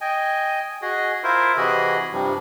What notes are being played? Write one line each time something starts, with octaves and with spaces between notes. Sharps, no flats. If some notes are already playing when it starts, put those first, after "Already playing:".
D#5 G5 G#5
F#4 G#4 D#5
E4 F4 A#4 C5 E5
C3 E3 F#4 G#4 D#5 B5
G2 C3 F3 G3